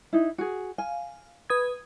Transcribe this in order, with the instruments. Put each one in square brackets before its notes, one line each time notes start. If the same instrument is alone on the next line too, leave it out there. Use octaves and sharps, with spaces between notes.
[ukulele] D#4 E4
F#4 G#4
[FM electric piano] F5 [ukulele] G#5
[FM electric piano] B4 D#6 G#6